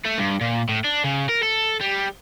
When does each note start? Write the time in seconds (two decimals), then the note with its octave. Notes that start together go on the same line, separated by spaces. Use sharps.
0.05 A3
0.19 G2
0.41 A#2
0.69 A2
0.84 D4
1.04 C#3
1.29 A#4
1.42 A4
1.81 G3